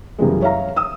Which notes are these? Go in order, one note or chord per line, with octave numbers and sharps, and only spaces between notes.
F#2 C#3 E3 G3 G#3
C#5 E5 F5 A#5
D#6 E6